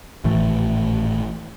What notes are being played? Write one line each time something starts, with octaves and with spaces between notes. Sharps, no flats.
G#1 A2 E3 A3